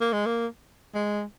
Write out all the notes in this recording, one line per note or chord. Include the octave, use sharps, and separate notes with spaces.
A#3
G#3
A#3
G#3